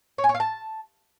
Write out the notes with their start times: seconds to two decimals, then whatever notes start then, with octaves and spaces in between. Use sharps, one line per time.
0.18 C#5
0.24 G#5
0.29 C#5
0.34 F5
0.40 A5